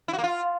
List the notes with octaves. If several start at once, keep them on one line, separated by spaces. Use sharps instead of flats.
E4
F#4
A#3
F4